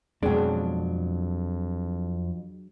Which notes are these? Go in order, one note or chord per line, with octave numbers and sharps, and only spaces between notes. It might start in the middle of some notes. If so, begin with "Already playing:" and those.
F2 B2 F#3 G#3 D4 G#4 G5